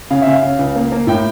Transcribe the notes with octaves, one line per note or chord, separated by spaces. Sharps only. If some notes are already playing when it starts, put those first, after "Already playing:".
C#3 F5
E5
C#3
F5
C#3
C#2
A#3
A#3
A2 G5